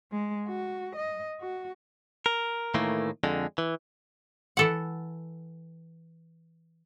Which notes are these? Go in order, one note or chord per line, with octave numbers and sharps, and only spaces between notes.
G#3
F#4
D#5
F#4
A#4
A2 D#3 E3 A3 A#3
F2 D3 G#3
E3
E3 A4 F#5